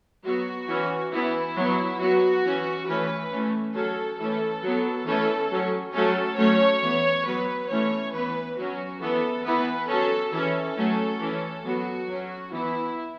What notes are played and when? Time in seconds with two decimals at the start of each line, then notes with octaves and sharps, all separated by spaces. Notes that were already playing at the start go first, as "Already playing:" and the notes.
0.24 F#3 B3 F#4
0.68 E3 C#4
1.12 E3 B3 E4
1.56 F#3 B3
1.99 F#3 B3 F#4
2.44 E3 C#4
2.87 E3 A3 C#4 B4
3.32 E3 A3 C#4
3.74 F#3 C#4 A4
4.19 E3 A3 C#4 A4
4.62 F#3 B3
5.06 E3 A3 C#4 A4
5.51 F#3 C#4
5.94 F#3 A3 C#4 A4
6.38 F#3 A3 C#4 C#5
6.82 E3 B3
7.26 F#3 B3 B4
7.69 E3 A3 C#4 C#5
8.13 E3 B3 B4
8.58 F#3 C#4 F#4
9.01 E3 B3 A4
9.45 E3 B3 B4
9.88 F#3 C#4 A4
10.32 E3 C#4 A4
10.77 F#3 A3 C#4
11.20 E3 C#4
11.64 F#3 B3 F#4
12.08 F#3 C#4
12.52 E3 B3 E4